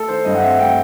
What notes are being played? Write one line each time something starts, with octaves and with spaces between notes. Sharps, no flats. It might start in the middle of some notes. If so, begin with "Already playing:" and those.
Already playing: A3 A4
D#3 C5
G2 D#5
F#5
C4 E5
A3 G5